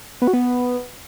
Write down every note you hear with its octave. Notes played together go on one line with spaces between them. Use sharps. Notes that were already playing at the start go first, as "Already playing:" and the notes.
B3
F#4
B3